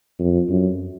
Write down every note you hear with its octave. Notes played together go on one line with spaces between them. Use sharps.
F2
F#2